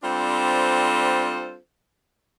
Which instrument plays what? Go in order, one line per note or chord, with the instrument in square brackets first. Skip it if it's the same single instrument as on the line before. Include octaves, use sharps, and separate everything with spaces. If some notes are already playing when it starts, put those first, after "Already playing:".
[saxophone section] G3 C4 D4 F4 A4 C5